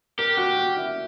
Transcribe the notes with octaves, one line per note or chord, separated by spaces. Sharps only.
G4 A#4
F#4
F#4
E4